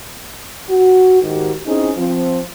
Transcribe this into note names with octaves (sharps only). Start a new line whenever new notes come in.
F#4
G#2 D#3 F#4 G4
C4 C#4 D#4 E4 G#4 C#5
F3 C4